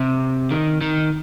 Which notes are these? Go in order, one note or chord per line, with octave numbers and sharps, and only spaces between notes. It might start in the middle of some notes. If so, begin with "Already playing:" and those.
Already playing: C3
D#3
D#3